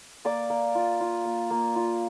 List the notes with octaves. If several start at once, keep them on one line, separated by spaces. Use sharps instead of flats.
A#3 D5 D6
A#3
F4
F4
A#3
A#3
F4